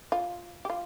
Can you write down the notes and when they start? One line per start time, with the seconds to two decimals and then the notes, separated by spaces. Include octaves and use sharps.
0.12 F4
0.65 G4
0.70 F4